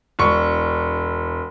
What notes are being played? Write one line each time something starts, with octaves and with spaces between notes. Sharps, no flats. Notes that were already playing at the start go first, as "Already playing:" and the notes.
E1 C#6